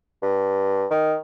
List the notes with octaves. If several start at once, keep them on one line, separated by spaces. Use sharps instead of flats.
G2
D#3